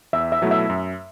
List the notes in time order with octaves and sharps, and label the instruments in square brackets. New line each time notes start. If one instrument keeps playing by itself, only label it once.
[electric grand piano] E2 [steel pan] E5
[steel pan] E5
[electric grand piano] B2 F#3 A3 E4
[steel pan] E5
[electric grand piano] F#2